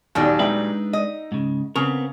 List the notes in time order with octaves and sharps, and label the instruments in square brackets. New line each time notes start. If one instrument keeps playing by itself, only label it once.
[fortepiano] D#2 D#3 [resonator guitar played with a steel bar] A#2 F#3 G3
[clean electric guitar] G#3 D4 B4 [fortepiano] D#4 E5 G5
[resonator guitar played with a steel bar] D#5
[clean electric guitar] G#2 C#3
[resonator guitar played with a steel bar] C#3 [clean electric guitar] B3 C4 A#4 [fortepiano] C#6